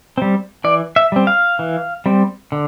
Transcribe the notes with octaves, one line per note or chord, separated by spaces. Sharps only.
G3 C4
E3 D5
E5
G3 C4
F5
E3
G3 C4
D3